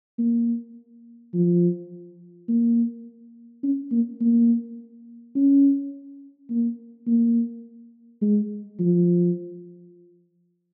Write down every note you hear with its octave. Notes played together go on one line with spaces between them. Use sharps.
A#3
F3
A#3
C#4
A#3
A#3
C#4
A#3
A#3
G#3
F3